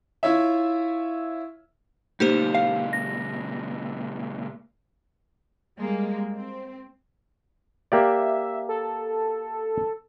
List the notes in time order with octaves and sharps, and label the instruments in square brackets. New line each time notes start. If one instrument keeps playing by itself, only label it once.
[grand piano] E4 F4 C#5 E5
[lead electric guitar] C#2 A#2 [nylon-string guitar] A#3 [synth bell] D#4 G4 C5
[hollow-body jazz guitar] F5
[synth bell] A#6
[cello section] G3 G#3 A#3
C4
[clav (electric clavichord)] A#3 G4 D5 [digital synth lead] E5
[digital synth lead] A4